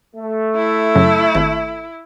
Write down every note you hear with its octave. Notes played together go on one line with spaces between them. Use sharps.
A3
E4
F#2 C#3 F#3
G#1 A5